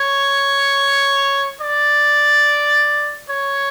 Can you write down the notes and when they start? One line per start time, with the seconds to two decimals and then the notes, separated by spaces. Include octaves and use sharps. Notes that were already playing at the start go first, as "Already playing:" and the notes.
Already playing: C#5
1.61 D5
3.30 C#5